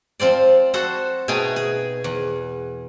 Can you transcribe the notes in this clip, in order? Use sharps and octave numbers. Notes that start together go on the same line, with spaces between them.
F3 C4 C5 D5
F#4 A4 C5 F#5
B2 A3 D#4 G#4 G5 G#5
G#4
E2